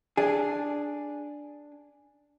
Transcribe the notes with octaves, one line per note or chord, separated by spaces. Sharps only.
D4 G#4